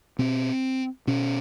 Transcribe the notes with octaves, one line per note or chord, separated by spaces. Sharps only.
B2 C4
B2 C#4